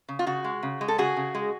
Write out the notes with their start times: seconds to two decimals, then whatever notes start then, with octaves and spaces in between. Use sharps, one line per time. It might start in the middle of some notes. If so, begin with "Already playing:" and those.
0.09 C#3
0.19 F4
0.26 C#3 F#4
0.44 G#3
0.63 C#3
0.81 G#3
0.88 A4
0.98 C#3 F#4 G#4
1.17 C#3
1.35 G#3